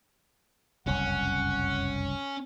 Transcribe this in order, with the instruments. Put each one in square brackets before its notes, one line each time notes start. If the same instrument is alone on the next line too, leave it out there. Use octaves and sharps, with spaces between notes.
[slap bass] F#1 C2 F2 [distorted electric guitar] C#4 [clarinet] F#5